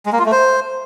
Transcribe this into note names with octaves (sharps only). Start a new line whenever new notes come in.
G#3
A#3
F4
A3
C5